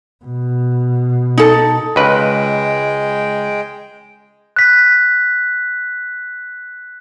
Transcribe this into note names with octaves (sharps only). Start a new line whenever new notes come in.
B2
D#4 A4
C#2 G#3 B4 G5
F#6 B6